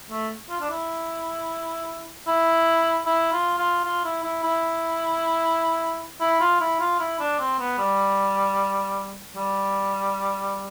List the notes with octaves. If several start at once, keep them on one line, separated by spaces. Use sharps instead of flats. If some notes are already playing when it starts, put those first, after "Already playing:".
A3
F4
D4
E4
E4
E4
F4
F4
F4
E4
E4
E4
E4
F4
E4
F4
E4
D4
C4
B3
G3
G3